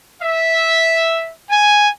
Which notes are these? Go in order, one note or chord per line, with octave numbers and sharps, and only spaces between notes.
E5
G#5